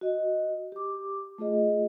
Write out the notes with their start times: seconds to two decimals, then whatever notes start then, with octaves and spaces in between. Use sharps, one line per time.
0.01 F#4 D#5
0.72 G4 D6
1.38 A3 F4 G#4 D#5